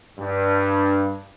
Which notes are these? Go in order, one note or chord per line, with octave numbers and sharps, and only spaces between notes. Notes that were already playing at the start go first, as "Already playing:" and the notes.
G2